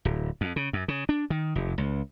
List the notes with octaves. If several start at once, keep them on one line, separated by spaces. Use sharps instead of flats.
D1
F2
C#3
F#2
C#3
D4
D#3
F1
C#2